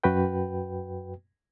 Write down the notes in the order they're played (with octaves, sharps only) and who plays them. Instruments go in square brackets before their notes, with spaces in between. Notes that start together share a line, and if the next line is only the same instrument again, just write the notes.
[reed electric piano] F#2 F#4 B4 G5